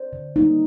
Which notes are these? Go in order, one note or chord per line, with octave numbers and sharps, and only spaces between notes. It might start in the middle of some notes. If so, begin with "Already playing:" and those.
Already playing: C5 D5
D3
G3 A#3 D#4